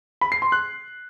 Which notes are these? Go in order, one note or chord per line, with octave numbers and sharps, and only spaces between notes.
B5
C7
C6
F#6